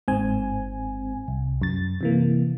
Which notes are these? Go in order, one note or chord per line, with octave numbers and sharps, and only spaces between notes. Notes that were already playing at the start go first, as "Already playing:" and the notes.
G1 G#2 C4 G#5
C2
F#2 A6
C3 E3 A#3